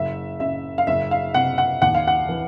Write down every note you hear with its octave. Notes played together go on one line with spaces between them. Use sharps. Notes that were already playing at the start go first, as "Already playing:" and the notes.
Already playing: F#1 E5
C#3 E5
F5
F#1 E5
F5
C3 F#5
F#5
D#2 F#5
F5
F#5
E3